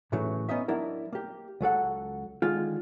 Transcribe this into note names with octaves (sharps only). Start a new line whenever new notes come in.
A2 C#3 E3 F#3 A3
B3 C#4 D#4 D#5 E5
F#3 D4 E4 A#4
A#3 G4
C#2 F#3 A4 F#5
D3 D#3 G#3 F4